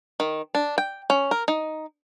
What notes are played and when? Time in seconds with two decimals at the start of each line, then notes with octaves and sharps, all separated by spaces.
0.20 D#3
0.55 D4
0.78 G5
1.10 C#4
1.31 A#4
1.48 D#4